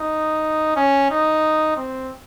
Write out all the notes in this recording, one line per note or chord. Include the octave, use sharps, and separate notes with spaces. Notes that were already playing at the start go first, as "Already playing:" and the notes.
Already playing: D#4
C#4
D#4
C4